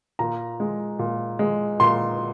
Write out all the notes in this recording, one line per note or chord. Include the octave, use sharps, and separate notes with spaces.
A#2 A#5
G#3
A#2
G#3
A#2 C6